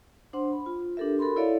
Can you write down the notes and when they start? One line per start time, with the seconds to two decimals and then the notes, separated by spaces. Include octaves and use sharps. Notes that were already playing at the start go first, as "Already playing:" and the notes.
0.33 D4 C5 F#5 C6
0.52 B5
0.66 F4
0.97 D4 G4 A4 A#4 E5
1.19 F#4 A4 A#4 B5 C6
1.36 E4 A4 C#5 D5 E5 F5